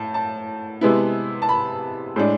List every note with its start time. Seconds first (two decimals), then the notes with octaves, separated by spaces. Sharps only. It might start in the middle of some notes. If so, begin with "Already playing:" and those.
Already playing: A2 A5
0.14 A5
0.81 C3 G#3 B3 E4
1.42 A5
1.49 B5
2.16 A2 G#3 D4